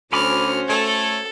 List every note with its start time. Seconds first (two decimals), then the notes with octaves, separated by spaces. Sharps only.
0.13 D2 C#4 F#4 C5 G#5 B5 D6 F6
0.69 A3 A4 C#5